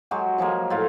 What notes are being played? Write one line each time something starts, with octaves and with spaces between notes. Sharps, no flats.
F#3 G#3 F#4 G4
F3 F#3 G#3 A#3
A2 F4 F5